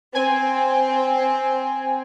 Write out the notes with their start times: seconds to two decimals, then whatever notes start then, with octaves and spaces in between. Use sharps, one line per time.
0.15 C4 G#5